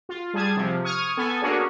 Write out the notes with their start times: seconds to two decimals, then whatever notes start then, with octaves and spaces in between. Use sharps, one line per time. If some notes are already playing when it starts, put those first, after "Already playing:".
0.09 F4
0.34 G3 G#4 A5 G#6
0.57 C3 F3
0.84 C#6 D#6 F6 G#6
1.17 B3 A4 G#5
1.42 A#3 C#4 D4 F#4 G#4 C#5